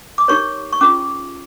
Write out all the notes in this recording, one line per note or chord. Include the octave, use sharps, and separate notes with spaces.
D6
D#4 G4 A#4 C#5 C#6
C#6
C#4 F4 G#4 D6